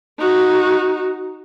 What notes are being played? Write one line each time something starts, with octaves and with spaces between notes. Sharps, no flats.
D#4 F#4